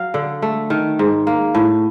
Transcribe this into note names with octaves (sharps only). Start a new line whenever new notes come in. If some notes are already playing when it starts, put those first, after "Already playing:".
Already playing: F#3 F5
D3
A3
D#3
G#2
A#3
A2